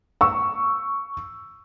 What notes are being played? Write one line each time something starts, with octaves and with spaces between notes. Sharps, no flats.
C#6 E6